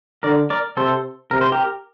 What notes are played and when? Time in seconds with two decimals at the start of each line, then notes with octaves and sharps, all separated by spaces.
0.23 D3 A#4 D5
0.50 A#4 D5
0.77 C3 A4 C5
1.31 C3 A#4
1.41 C5
1.52 G4 A#4